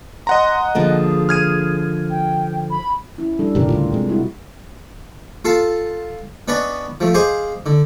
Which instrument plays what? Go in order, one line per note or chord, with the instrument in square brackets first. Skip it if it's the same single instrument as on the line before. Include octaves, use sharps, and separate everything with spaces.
[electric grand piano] D#5 F#5 A#5 [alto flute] C6
[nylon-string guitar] D3 F3 A#3 [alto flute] G#4
[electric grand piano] F6 G#6 D#7
[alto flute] G5
B5
[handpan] C#4 E4
G3 D4 A4
[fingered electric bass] E1 G2 C#3 [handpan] G4 A#4
[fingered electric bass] D2 A2 C#3 [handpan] F4
[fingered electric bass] C3 G#3
[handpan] G3 E4 F#4
[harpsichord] F4 A4 F5 A5
B3 C#4 D4 B4 D5 D#5
F3 A3
G#4 C5 D#5 F5 G#5 D6
D3